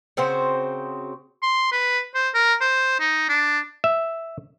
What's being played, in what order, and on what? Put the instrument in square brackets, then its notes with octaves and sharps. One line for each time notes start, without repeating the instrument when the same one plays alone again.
[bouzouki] C#3 C4 F#4 C5
[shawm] C6
B4
C5
A#4
C5
D#4
D4
[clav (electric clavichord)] E5